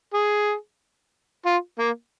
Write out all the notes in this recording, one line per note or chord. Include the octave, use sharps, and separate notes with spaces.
G#4
F4
A#3